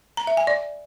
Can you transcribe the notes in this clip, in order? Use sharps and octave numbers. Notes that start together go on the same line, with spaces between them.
A#5
E5
G#5
D5